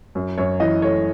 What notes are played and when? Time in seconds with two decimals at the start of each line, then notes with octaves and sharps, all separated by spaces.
0.15 F#2
0.38 F#2 C#5
0.60 E3 D#5
0.82 A3 C#5